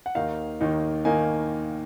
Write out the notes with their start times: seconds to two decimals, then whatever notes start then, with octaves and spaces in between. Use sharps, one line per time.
0.06 F#5
0.15 D#2 D#3 A#3 D#4 F5
0.61 D#2 D#3 A#3 D#4
1.05 D#3 A#3 D#4 G#5